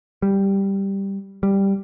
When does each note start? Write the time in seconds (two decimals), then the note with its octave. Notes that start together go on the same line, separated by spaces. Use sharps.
0.22 G3
1.43 G3